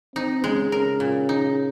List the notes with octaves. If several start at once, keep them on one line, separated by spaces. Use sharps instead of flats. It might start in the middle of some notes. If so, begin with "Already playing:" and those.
C4 D#4
C#3 G#3
C#3 A#4
A#2
D#4